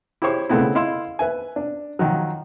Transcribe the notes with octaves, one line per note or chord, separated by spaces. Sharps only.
E4 G4 G#4 C5 C#5 C#6
C#3 G#3 A3 B3 C4 E4
E4 D#5 F5 C6 E6
B4 E5 G#5
D4
D#3 F3 F#3